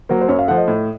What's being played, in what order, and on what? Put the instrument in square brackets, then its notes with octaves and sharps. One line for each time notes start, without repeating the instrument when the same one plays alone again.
[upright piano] F#3 A#3 [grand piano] C5
[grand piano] C5
[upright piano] F#2 [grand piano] C#5
[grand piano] F5
[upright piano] F3 A3 [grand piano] F#5
[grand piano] D#5
[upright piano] A2